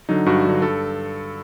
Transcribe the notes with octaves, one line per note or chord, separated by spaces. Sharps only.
D3 F#3 D#4
G2 F#4
D3 F#3
G2 A4